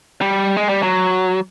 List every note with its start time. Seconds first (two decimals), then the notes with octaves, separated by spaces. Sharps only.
0.21 G3
0.56 G#3
0.69 G3
0.83 F#3